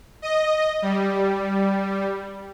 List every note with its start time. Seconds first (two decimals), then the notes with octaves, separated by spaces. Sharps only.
0.22 D#5
0.82 G3